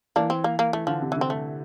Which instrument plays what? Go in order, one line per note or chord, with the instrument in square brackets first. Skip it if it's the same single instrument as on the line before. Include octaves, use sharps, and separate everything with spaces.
[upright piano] E3 [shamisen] A#3 D4
[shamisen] C4
A#3
A#3
[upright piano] E3 [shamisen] A3
[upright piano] D3 [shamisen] F3
[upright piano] C3
[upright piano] D3 [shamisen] E3
[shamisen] C4
A3